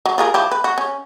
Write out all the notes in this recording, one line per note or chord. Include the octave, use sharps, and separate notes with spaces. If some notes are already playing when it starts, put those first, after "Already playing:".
F#3
F4 G#4 A#4
F3 E4 G4
B4
F#4
C#4